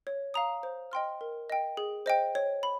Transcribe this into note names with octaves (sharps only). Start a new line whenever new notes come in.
C#5
F5 A#5 D#6
C5
D#5 G5 C6 F6
A#4
D#5 G5
G#4
C5 D#5 G5
C#5
B5